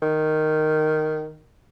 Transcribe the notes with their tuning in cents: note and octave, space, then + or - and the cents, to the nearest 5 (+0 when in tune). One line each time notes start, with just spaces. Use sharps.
D#3 -5